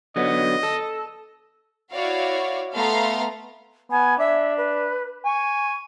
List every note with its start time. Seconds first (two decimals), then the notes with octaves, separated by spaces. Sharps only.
0.16 D3 F#3 B3 D#5
0.63 A4
1.92 E4 F#4 C#5 D5 F5
2.74 A3 B3 F5 A#5 C6
3.91 B3 G#5
4.19 D4 E5
4.57 B4
5.25 G#5 C#6